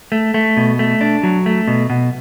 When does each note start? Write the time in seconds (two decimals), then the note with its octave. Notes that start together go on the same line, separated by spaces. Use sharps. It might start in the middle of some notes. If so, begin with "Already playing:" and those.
0.12 A3
0.34 A3
0.57 B2
0.79 A3
1.01 D4
1.23 F#3
1.46 A3
1.68 B2
1.90 B2